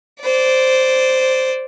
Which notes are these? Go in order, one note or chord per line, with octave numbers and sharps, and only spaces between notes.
C5 D5